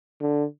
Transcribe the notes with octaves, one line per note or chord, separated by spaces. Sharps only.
D3